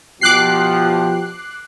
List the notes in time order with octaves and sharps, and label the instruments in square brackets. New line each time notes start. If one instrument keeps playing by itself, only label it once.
[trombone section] B2 G4 [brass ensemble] F3 [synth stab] D6 F#6 C7